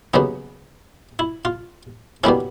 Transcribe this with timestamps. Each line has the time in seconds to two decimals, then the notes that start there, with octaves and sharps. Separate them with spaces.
0.14 D#2 C#3 F#3 B3 D#4
1.19 E4
1.45 F4
2.24 B2 G3 A#3 C#4 E4